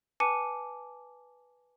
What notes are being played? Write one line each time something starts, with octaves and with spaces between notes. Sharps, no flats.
B4 G#5 A5 D6 C#7 D#7